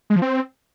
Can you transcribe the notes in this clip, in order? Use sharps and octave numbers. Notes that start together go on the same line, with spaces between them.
G#3
F3
C4